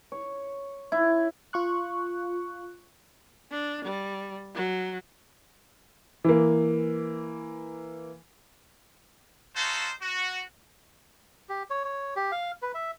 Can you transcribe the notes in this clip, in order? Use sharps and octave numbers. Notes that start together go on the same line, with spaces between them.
C#5
E4
F4 C#6 F#6
D4
G3
F#3
E3 A#3
C#4 D#4 F4 F#4 A4 C5
F#4
G4
C#5
C#5
G4
F5
B4
E5